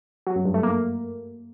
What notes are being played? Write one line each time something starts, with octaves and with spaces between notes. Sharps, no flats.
F#3
F#2
G2
A3
A#3